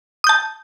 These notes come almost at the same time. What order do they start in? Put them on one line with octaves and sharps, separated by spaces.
D#6 G6 A5